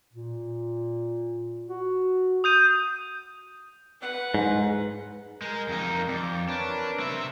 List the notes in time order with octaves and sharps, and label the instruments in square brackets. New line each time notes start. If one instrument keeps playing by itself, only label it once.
[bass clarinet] A#2
F#4
[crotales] D#6 G6 D#7
[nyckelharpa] B4 F#5
[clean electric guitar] G#2
[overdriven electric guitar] G#3 [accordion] A#4 G6
[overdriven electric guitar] F2 D#4
[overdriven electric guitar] F2 [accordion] D5 G6
[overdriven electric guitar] D4 [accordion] A#4 B4 C#5
[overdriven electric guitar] C4 E5